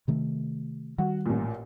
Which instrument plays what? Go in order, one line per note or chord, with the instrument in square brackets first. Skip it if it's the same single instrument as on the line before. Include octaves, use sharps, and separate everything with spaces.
[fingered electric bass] C3 D#3 A3
[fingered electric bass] D#3 G3 [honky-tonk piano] F#4
[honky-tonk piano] A1 A#2